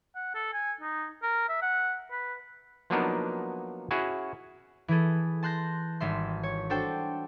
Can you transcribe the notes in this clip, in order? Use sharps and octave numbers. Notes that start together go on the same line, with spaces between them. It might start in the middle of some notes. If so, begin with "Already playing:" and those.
F#5
A4
G#5
D#4
A#4
E5
F#5
B4
F3 F#3 A#3 B3 D4 D#4
C#4 E4 F#4 G#4
E3 E4 G#4 A4
A5 C6 F#6 G6 A#6
G#1 G3 E5 C6
C#5
D4 F#4 A4 C5 G5